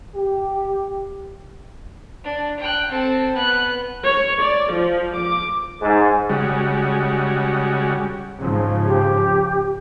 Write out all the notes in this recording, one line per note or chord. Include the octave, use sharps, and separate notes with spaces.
G4
D4
G5 F#6
C4 A4
B3 F#6
C#5
D5
F3
D6
G#2
C#3 G3 G#3 F#4
G#2 C#3 F3
G4